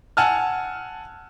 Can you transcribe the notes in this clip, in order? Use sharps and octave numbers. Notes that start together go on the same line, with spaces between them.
F#5 G#5 A5 E6 F6